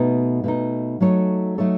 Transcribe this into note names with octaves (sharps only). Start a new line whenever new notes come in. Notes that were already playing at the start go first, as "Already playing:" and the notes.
Already playing: B2 A3 D#4
B2 A3 D#4
F#3 A3 D#4 A4 C#5
F#3 A3 D#4 A4 C#5